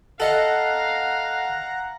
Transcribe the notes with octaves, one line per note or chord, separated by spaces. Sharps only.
A4 D#5 F5 F#5 A#5